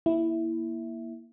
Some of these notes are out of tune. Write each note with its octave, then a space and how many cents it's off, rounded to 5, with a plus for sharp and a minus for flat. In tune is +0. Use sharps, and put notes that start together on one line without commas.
A#3 +20 E4 +0